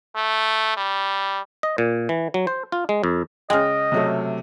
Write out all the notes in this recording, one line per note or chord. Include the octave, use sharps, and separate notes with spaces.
A3
G3
D#5
A#2
E3
F#3
C5
F4
G#3
F2
C#3 G#3 D#5 G5 F6
C3 F#3 A3